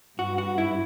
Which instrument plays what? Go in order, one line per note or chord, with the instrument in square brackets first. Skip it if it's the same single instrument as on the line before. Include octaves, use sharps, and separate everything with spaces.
[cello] G2 [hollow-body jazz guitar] F#4
[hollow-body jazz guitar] F#4
E4